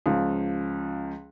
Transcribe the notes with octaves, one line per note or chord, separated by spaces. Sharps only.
C#2 F3